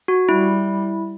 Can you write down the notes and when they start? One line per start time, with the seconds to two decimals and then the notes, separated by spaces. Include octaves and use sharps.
0.08 F#4
0.29 G3 E4